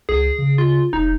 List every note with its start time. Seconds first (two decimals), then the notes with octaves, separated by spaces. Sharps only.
0.09 C#2 G#4
0.38 C#3
0.58 F4
0.93 F1 D#4